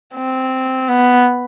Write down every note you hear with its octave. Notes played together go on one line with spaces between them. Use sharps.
C4
B3